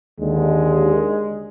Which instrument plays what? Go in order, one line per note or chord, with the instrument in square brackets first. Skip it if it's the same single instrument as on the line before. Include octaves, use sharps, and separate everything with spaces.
[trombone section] D#2 D3 [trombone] G#3